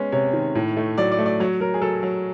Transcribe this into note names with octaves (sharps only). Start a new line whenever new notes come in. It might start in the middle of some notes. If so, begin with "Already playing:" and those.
Already playing: G#3 B3 C#4
C3 C#5
D#3
A2
A3
F#3 D5
D5
A3
D5
F#3 C#5
F#3 A#4
G#4
F#3 A4
F#3